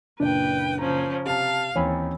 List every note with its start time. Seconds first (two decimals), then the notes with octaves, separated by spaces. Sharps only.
0.20 F#1 A#2 D4 B4 G5
0.79 C#3 F3 C#4 A#5
1.25 C3 F5 A5
1.76 D#2 E3 C4 C#4 C#5 G#5 B5